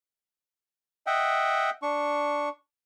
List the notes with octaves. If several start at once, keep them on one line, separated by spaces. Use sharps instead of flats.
D#5 E5 F#5 G5
D4 C#6